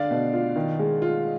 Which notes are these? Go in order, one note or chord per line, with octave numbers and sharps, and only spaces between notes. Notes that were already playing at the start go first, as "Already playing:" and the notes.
Already playing: D3 D4 D5 F5
B2
F4
D#3
G#3
F4